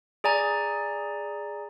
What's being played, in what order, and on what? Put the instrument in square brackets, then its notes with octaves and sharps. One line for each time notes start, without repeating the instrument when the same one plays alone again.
[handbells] G#4 D5 G#5 A#5